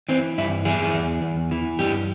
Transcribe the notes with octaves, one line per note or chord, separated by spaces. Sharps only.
E3 C4
G2 E4
E3 G#4
E2
E2
E3
G2 G4